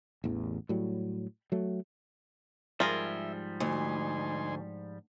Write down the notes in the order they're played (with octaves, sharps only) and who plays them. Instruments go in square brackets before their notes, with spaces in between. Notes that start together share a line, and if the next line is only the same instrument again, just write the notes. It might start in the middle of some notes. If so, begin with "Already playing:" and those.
[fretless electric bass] A1 E2
A2 F#3 G3
F#3 A3
[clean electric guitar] G#2 F3 G3 [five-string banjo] F4 G#4 A#4 [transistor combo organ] E5
[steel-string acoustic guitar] D2 [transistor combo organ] D#4 G#5 C6